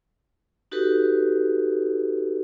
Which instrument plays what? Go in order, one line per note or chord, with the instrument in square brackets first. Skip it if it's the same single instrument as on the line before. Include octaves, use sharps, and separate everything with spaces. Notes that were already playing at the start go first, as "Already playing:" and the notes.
[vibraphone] D#4 F#4 G4 A4 B4